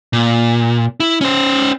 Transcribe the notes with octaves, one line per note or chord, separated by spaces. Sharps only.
A#2
E4
C#4 C5